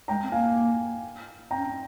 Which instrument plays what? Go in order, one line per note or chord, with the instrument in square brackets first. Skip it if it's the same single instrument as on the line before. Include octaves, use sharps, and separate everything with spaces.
[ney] G#3 [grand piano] G5 A#5
[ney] C4
[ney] A#3 [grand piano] F5 G#5
[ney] C4 [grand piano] G5 A#5
[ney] C#4
C4